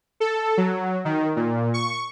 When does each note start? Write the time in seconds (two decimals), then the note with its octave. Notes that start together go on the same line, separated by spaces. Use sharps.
0.20 A4
0.58 F#3
1.05 D#3
1.36 A#2
1.74 C#6